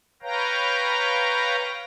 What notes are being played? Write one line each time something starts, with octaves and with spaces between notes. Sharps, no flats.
B4 C#5 F5 G5 A#5